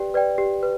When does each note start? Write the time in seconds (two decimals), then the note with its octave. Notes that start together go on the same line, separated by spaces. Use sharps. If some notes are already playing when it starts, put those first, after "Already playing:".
Already playing: G4 B4 D5 G5
0.14 B4 D5 G5
0.38 G4
0.63 B4